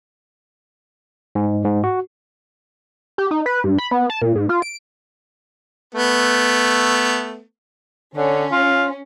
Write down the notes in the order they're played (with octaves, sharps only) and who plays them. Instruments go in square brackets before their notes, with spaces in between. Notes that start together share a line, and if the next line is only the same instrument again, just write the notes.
[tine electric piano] G#2
G#2
F#4
[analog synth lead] G4
D#4
B4
G2
B5
B3
A5
A#2
G#2
F4
D7
[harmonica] A3 B3
[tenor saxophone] D3 [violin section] C#4
[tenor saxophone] F4